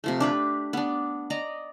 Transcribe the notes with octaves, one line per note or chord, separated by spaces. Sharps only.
C3 F3 A3
D4 G4 B4
B3 D4
D5 D#5 A#5